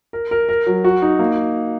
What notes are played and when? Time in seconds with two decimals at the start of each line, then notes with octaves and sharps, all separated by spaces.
0.13 A#4
0.31 A#4
0.49 A#4
0.67 F#3
0.84 F#4
1.02 D#4
1.19 A#3